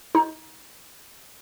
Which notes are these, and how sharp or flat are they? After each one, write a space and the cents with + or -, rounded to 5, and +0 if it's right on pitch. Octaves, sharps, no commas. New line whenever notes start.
D#4 +25